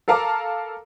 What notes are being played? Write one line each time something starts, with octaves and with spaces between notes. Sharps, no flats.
A4 A#4 F5 A5 A#5 D6